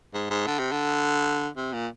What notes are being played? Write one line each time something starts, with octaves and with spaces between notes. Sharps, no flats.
G#2
G#2
D3
C3
D3
C3
A#2